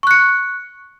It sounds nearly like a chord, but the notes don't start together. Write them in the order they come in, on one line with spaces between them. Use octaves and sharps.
C#6 F#6 C#7